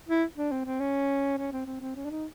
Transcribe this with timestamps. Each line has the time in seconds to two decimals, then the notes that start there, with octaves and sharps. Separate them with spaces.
0.09 E4
0.37 D4
0.52 C4
0.66 C4
0.80 C#4
1.38 C#4
1.53 C4
1.66 C4
1.81 C4
1.96 C#4
2.05 D4
2.10 D#4